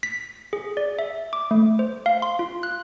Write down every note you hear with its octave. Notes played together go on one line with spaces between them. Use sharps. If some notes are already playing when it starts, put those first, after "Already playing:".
B6
G#4
D5
E5
D6
A3
C5
F5
C6
F4
F#6